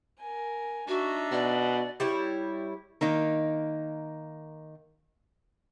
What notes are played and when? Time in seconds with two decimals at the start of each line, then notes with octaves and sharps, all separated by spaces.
0.21 A#4 G#5
0.88 D4 D#4 F#4 E5
1.32 B2 D5
2.00 G3 E4 C#5
3.01 D#3 A#3 D#4